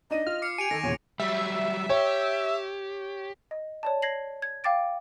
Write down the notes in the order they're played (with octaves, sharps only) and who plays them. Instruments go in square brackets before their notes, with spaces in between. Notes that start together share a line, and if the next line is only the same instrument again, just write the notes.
[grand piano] D4 D#4 D#7 [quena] D#5
[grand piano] F4 [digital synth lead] F6
[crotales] D6 C7 C#7
[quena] G4 [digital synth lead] G#5 [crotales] C#7 D7 F7
[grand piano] D#3 [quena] A4 [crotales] A#6
[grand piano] E2 A#2 C#3 [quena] C#5
[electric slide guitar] F#3 G3 [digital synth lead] E5
[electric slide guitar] G4 [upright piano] C#5
[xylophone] D#5
C#5 D5 A5
G#6 A#6 C7 F#7
G#6
F5 G5 D6 A6 D7